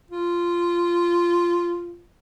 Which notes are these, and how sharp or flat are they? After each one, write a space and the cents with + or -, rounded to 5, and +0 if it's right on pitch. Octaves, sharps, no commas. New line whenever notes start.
F4 -10